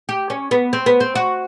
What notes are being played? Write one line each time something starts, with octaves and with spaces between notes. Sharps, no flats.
G4
C#4
B3
C4
B3
C4
F#4